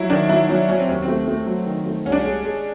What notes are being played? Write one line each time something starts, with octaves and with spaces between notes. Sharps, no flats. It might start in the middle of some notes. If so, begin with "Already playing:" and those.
Already playing: F#3 E4
D#3 D4
F#3 E4
F#3 C#4
F#3 C#4
C4
D#2
C4
A3
A3
F#3
D#3
A3
C2 C#4
D4
C#4
G#3
G#3